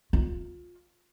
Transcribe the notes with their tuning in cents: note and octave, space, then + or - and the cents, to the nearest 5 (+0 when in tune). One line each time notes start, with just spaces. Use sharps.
F4 +20